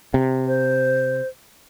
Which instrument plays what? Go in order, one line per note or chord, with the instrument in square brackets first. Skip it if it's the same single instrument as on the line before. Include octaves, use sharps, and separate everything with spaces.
[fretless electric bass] C3
[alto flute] C5